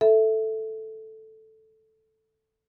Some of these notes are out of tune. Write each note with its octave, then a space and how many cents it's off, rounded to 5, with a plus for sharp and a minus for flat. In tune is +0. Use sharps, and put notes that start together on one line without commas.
A4 +0 E5 +0